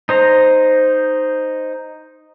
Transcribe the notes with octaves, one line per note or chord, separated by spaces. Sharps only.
D#4 C5 A#5